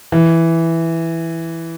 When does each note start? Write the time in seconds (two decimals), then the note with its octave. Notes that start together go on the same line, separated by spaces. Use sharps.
0.12 E3